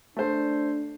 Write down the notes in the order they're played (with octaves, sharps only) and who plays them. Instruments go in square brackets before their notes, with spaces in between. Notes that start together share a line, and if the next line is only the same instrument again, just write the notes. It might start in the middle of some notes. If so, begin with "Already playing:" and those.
[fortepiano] A3 C5 [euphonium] D4